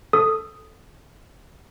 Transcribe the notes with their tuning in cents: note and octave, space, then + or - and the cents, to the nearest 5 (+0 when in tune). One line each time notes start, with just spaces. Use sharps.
A4 +0 D#6 +0